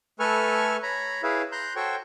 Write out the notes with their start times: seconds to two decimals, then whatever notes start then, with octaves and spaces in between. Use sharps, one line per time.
0.20 A3 A4 B4 G#5 C#6 F6
0.83 C#5 A#5 B5
1.23 E4 G#4 B4 C#5 E5 F5
1.52 A#5 C6 F#6 G6
1.76 F#4 A4 C5 C#5 G5 C#6